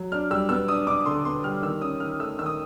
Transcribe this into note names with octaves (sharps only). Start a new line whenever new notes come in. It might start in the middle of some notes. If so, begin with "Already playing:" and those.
Already playing: F#3
D4 F6
G3 E6
B3 E6
D4 D#6
D4 D6
D3 C6
B3 C6
G3 F6
D#3 E6
C#4 D#6
D#3 F6
A3 E6
D#3 E6
D#6